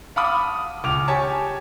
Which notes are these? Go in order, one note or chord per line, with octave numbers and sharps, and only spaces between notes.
F5 F#5 A5 B5 D6 D#6
C#2 D6 F6 F7
G4 C#5 G#5 A5